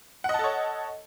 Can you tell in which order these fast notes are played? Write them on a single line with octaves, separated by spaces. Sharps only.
F#5 D#5 A5 A4 C#5